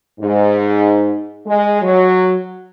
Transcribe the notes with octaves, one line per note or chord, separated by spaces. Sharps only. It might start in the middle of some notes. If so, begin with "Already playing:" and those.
G#2
G#3
F#3